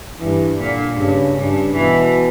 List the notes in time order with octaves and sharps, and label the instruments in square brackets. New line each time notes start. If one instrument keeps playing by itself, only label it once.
[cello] G2 [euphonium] E3
[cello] A#2 [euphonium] D3
[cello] G2 [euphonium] C#3
[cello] G2
[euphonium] B2 [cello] E3